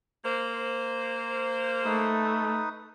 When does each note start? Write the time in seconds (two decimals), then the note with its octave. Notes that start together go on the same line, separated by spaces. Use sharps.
0.25 A#3 C5
1.85 A3 D#4 B4 D#6